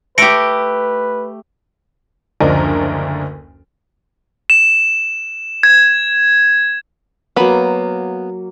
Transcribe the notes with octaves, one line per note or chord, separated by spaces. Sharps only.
A3 G4 B4 A#6 C#7 D7
F#1 D2 F3 D4 A#4 D#5
E7
G#6
F#3 A#3 B3 B5